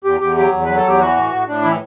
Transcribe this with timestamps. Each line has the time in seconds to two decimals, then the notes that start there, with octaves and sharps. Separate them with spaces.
0.04 E2 G4
0.20 E2 G4
0.36 F#3 G4
0.52 E2
0.65 F#3 B4
0.77 A4
0.84 E2 G4
1.00 E3 F#4
1.16 A2
1.32 A2
1.48 A2 D4
1.62 E3 E4